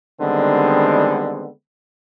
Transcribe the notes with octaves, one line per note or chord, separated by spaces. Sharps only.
D3 D#3 G3 G#3 B3 C4